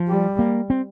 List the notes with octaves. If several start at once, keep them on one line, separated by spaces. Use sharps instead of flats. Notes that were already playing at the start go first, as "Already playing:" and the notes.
Already playing: F3
G3
A#3
C4